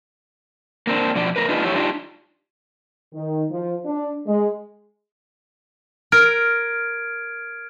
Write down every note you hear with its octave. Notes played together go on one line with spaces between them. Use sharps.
A#3 C4 D4
B2 F3 D5
A2 A#4 B4
D4 D#4 F4 G#4 B4 D#5
F2 E4 G4 C#5 E5
D4 D#4 F4 G4
D#3
F3
D4
G#3
A#4 F6 G#6 D7